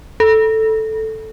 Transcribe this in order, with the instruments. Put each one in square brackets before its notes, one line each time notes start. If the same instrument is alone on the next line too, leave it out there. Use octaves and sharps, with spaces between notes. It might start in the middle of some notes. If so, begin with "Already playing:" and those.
[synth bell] A4